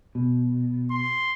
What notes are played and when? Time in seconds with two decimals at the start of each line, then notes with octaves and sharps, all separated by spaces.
0.15 B2
0.91 C6